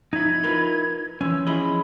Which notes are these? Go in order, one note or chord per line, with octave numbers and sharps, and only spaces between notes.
F2 D#4 E4 G#6
F4 A#4 B4
E3 F3 C#4 E6
E4 G#4 D#5 B5